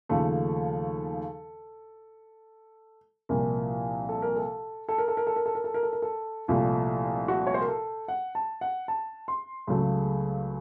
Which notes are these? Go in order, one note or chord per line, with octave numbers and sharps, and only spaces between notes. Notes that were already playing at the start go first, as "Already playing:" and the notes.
D#2 C#3 F3 A3 A4
C2 A#2 F3 A#4
A4
A#4
A4
A4
A#4
A4
A#4
A4
A#4
A4
A#4
A4
A#4
A4
A#4
A4
C2 A#2 F3 A3 F4
F#4
C#5
C5
A#4
A4
F#5
A5
F#5
A5
C6
C#2 C#3 F#3 A3